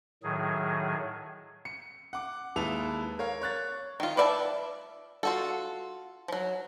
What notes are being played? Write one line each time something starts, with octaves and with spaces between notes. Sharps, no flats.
A2 D#3 F#3 G#4
C#7
F#5 D6
D#2 G#3 E4 B4 A5 F7
A#4 C#5 F5
C#5 F#6 A6
D#3 F4
B4 D5 E5 F5 A5
F4 F#4 A4
F3 F#3